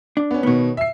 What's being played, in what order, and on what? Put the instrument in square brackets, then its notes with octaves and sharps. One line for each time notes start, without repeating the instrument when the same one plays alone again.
[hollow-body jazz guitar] D4
[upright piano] B3 C#4
[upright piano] B2 D#3 [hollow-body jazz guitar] B3 C#5
[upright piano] E5 C7